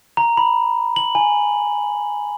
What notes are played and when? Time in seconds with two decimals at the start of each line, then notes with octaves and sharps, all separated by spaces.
0.17 A#5
0.37 B5
0.96 F#7
1.15 G#5